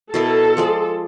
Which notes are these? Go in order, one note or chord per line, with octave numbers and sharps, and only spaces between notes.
B2 E4 A4 A#4
F3 G#3 D5